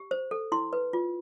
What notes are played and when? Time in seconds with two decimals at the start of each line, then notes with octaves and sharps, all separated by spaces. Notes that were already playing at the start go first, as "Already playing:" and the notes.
Already playing: G4
0.11 C5
0.31 A4
0.52 E4 C6
0.73 B4
0.93 F4